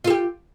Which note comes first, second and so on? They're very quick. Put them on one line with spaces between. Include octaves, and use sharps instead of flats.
F4 A4 G4